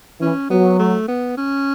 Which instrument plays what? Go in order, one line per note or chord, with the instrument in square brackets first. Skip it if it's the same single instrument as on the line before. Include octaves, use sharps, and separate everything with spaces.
[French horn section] E3 [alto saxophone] C#4
[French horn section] F#3 [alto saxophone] B3
[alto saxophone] A3
B3
C#4